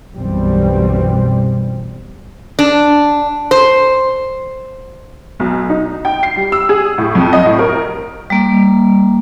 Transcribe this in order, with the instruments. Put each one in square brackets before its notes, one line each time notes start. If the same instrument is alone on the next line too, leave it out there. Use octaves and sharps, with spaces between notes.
[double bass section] B1 F#2 B2 E3 G3 C4
[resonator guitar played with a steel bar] D4
C5
[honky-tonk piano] B1
D#4
G5
C7
G3
E6
G#4
A2
F2
D#5
A2
A#4
[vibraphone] G3 A#3